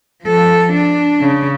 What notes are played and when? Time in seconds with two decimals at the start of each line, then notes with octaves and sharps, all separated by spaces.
0.23 F3 A4
0.73 D4
1.21 C#3